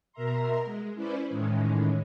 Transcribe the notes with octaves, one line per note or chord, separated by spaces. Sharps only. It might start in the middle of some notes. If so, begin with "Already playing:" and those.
B2 A#4 E5 A#5 C6
G#3
C#4 E4 B4 C5 D5
A2 D#3 E3 G#3 C#4